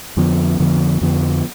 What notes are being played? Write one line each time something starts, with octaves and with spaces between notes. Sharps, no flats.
F2 D3 F3 B3
F2 D3 F3 B3
F2 D3 F3 B3